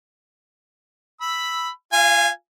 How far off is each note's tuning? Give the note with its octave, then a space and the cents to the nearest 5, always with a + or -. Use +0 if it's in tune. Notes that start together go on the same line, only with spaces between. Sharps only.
B5 +0 E6 +0
F4 +0 F5 -35 G#5 -10